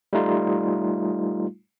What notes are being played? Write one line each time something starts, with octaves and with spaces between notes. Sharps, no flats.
G3 A3 D#4 F4